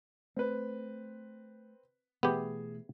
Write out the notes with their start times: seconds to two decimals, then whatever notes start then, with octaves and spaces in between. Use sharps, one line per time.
0.36 A3 C4 B4
2.23 B2 E3 A3 B3 G4 G#4 E5